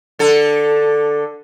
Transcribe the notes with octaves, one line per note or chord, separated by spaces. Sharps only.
D3 A4